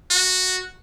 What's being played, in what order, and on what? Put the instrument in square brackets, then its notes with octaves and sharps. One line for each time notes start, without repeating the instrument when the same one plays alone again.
[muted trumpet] F#4